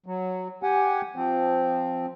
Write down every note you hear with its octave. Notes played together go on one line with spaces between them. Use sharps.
F#3
G4 F#5 G#5
F3 C4